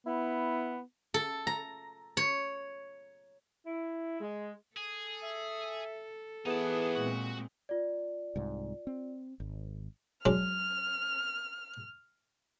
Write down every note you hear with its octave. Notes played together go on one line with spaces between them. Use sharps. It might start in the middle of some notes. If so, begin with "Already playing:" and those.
B3 E4
A4
A#5
C#5
E4
G#3
G#4 A4
E5
E3 B3 D#4 G#4 A5
A#2 G#3 C4 F#4
F4 D5
C2 G#2
C4
G#1
F#3 G#3 D4 F6